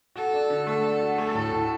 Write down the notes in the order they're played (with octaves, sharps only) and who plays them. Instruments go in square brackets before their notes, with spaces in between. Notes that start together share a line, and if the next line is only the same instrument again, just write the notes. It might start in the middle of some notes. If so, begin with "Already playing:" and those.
[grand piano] F#4 [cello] A4
[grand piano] D4
D3
[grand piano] A3 [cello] A4
[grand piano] D4
F#4
[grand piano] A3 [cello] A4
[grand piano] A2
A2